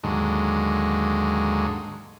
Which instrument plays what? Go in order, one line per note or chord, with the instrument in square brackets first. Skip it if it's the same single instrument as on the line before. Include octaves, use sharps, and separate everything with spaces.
[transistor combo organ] D#2 G#2 D3 F#3 G#3